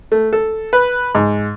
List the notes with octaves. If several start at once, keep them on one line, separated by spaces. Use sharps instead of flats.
A3
A4
B4
G#2